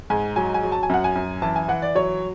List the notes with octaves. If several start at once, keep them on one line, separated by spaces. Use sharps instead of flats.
G#2 G#5
F#3 G#5
G#5
F#3
A5
G#5
F#2 F#5
G#5
F#2
E3 A5
G#5
E3 F#5
D5
F#3 C#5